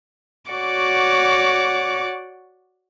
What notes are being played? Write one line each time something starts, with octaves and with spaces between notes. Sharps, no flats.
F#4 C#5 D5 F#5 D6